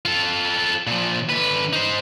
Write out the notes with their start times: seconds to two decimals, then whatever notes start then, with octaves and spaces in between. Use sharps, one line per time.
0.05 F4 A4
0.87 A#2 F3
1.29 D3 B4
1.73 D#4 C5